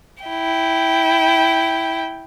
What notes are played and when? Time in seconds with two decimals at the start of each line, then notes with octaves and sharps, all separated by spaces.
0.24 E4 G5